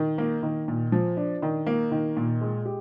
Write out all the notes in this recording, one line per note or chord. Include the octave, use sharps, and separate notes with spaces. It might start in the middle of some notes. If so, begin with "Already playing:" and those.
Already playing: D#3
A#3
D#3
A#2
F3
D4
D#3
A#3
D#3
A#2
G#3
G4